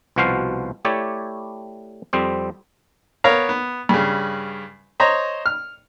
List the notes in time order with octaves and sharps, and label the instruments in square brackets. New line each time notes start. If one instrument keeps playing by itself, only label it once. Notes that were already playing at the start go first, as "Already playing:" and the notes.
[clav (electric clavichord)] C2 B2 F3 F#4 C5 F5
A3 E4 G4 C#5 D5
F2 G3 C4 C5
[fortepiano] B3 A#4 C#5 F5 A#5
B3
G2 C#3
C5 C#5 D#5 A#5
F6